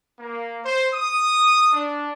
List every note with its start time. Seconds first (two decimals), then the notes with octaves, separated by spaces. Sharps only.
0.19 A#3
0.65 C5
0.94 D#6
1.72 D4